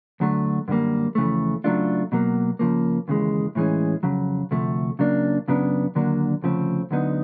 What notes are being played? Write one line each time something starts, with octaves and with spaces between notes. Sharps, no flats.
D2 D3 F#3 A3
F#2 D3 G3 A#3
F2 C#3 E3 A3
C#3 F#3 A3 D4 F4
B2 F#3 A#3
C#3 F3 A#3
D#2 C#3 E3 G#3
A2 E3 G#3 C#4
F2 C#3 F#3
D2 C3 F3 A3
C#3 F#3 A#3 D4
F#2 C#3 F#3 B3 D4
D#2 D3 F#3 A#3 D4
D2 C#3 F3 A3 C4
D2 D3 F#3 B3 D#4